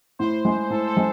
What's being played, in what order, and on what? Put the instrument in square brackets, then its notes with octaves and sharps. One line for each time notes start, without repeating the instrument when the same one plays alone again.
[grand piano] A2 [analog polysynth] C5
[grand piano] G#3
[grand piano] A2 [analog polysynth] A4
[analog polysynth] A4
[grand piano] G#3